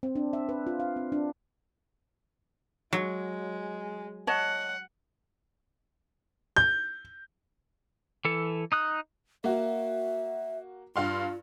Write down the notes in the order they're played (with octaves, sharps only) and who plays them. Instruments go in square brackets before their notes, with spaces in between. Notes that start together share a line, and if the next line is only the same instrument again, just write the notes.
[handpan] C4
D4
E5
B4
F4
F5
C4
D4
[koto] F#3 [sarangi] G#3
[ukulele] C#5 D#5 A5 [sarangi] F#5
[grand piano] G6
[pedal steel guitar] E3 A4
D#4 D#6 F#6
[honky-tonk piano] A#3 F#4 [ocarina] E5
[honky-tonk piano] G2 F5 C6 [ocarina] F4